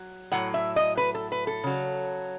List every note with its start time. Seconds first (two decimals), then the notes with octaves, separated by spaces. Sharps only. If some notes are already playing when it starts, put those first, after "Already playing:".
Already playing: F#3
0.32 A2 F#3 F#5
0.54 E5
0.76 D#5
0.97 B4
1.15 A4
1.32 B4
1.47 A4
1.64 C#3 F#3